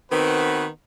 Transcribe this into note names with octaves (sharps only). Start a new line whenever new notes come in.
D#3 B3 C4 F#4 B4